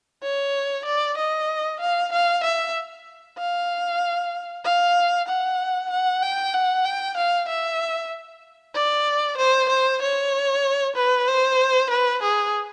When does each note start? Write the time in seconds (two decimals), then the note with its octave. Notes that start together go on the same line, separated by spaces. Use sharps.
0.23 C#5
0.86 D5
1.18 D#5
1.81 F5
2.13 F5
2.44 E5
3.38 F5
4.65 F5
5.29 F#5
5.91 F#5
6.23 G5
6.54 F#5
6.85 G5
7.17 F5
7.49 E5
8.75 D5
9.38 C5
9.69 C5
10.02 C#5
10.96 B4
11.28 C5
11.91 B4
12.23 G#4